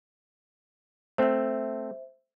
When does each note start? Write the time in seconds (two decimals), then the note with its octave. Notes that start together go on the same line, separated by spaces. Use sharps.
1.18 A3 C4 C5 E5